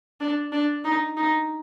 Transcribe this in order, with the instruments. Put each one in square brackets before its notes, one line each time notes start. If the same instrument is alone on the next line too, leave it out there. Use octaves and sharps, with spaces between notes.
[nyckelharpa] D4
D4
D#4
D#4